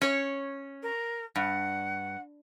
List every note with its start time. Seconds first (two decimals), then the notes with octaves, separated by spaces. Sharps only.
0.01 C#4 C#5
0.82 A#4
1.36 G2 F#5